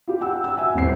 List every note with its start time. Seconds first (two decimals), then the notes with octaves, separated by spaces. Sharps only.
0.08 F4 G4
0.21 F#5 G5 E6
0.44 E6
0.57 F#4 E5 F#5 G#5
0.74 D#1 A2 C4 C7